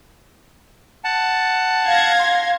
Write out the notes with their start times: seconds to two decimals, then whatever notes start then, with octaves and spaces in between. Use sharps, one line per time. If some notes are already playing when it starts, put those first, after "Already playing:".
1.04 F#5 A5
1.85 F5 G#6 A#6
2.19 C6